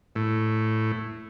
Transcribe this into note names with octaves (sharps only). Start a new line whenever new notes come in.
A2